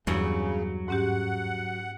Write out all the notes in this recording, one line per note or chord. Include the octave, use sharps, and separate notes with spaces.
E2 G2 C#3 F#3
G#2 C#4 G4 F#5